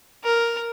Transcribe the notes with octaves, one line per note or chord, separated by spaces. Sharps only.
A#4